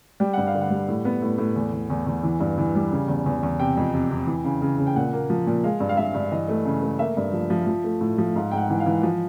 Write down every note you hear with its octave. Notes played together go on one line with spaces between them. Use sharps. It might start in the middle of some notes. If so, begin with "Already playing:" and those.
G3 G5
G2 F#5
F5
D3
F#5
G3
A2
B3
A2
A2
E2
E2
E2
E2
E3
G2
E3
G3
C#3
E2
E2
E2
C3 G5
F2
C3
C3
E3
C#3
C#3
C#3
G5
A#2 F#5
A#3
F3
A#2
G#3 F5
G2
F5
G2 E5
G2
E3 D#5
A3
C#3
A3
A#3 E5
G2
F3
F3
F3
A3
A2
F3
G#2 F5
G#2 G5
F#5
E3
F5
E3
F3